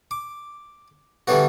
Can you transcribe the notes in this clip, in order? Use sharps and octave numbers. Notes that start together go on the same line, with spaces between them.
D6
D3 E3 G3 B3 F#4